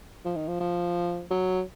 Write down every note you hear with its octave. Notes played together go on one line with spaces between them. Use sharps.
F3
D#3
F3
F3
F#3